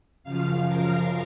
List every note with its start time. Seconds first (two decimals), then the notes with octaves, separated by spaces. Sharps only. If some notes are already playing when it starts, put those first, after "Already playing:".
0.24 F#2 C#3 F3 F5
0.68 A#4